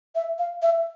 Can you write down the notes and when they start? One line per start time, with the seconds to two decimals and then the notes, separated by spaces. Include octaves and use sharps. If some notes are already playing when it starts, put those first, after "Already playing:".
0.15 E5
0.39 F5
0.62 E5